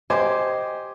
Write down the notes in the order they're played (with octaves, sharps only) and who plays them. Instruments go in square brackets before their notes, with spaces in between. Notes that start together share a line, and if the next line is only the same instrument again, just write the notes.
[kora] G4 [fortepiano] C5 G#5 [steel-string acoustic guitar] D#5